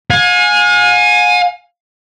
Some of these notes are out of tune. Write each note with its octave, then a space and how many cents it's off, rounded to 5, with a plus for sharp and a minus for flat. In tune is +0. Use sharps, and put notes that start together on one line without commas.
F5 +45 G#5 +0